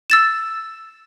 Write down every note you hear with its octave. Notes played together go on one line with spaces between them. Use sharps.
E6 A6 E7